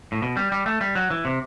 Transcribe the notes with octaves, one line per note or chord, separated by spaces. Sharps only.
A2
B2
G3
G3
A3
G3
F#3
E3
C3